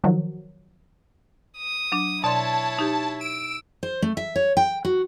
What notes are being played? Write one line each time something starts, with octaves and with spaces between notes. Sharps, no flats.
D#3 F3 F#3
D#6
F#3 D4
B2 E4 C#5 D5 A5 C6
D#4 G4
E6 D7
C5
A3
E5
C#5
G5
F#4